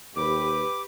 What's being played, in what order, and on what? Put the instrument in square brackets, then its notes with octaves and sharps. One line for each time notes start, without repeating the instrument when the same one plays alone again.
[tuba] D#2 [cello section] G4 B4 [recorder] D6